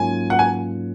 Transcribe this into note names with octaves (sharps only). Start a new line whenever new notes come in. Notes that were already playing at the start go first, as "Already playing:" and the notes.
Already playing: G#2 F#3 A#3 C#4 F4 G#5
F#5
G#5